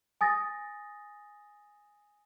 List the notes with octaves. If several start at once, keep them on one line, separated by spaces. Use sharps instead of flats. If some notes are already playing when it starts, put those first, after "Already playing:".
G#5 D#6 A6 A#6